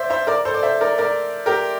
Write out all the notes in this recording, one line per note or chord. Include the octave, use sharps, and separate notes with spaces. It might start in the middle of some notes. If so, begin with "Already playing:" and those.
Already playing: C5 D5 E5
C5 E5
A#4 D5
A4 C5
D5
C5 E5
A#4 D5
A#4 D5
G4 A#4